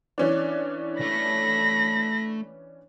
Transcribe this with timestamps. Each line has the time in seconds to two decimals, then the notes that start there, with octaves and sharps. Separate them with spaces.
0.18 E3 C#4 D4
1.00 A3 B5 A#6